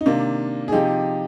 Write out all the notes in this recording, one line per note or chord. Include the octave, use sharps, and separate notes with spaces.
D#4
C3 D#3 A#3 D4
G#4
C3 F3 D#4 G4